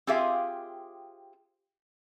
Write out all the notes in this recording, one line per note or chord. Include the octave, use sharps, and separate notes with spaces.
C4 F4 G4 G#4 E5 F5